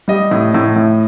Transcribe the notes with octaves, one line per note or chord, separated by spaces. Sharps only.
G3 D#5
A2
A2
A2